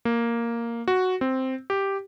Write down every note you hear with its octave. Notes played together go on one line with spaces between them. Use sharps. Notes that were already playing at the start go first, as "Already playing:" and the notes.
A#3
F#4
C4
G4